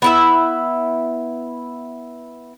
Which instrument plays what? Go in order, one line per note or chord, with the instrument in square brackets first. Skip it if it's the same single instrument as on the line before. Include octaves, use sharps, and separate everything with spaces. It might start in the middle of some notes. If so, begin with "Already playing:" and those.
[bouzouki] B3 E4 E5